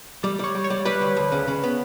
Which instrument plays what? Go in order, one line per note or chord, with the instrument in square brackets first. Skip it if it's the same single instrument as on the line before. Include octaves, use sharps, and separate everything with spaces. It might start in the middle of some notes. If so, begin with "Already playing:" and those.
[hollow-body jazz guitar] G3 [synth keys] D5
[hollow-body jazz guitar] G3 [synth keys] C#5
[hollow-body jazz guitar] G3
[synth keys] C#5
[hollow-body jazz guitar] G3
[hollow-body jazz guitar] G3 [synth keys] B4
[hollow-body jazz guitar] D2
D2
C#3
C#3
B3